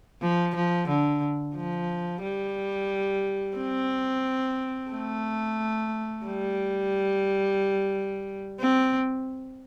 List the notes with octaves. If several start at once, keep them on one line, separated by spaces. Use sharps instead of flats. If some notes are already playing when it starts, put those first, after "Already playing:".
F3
F3
D3
F3
G3
C4
A3
G3
C4